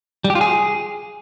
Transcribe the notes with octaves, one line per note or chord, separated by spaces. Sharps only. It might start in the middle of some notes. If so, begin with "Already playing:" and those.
G3
G4
F4
G#4